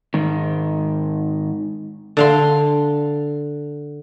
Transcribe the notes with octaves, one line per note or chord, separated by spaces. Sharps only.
G#2 D#3
D3 F5 C6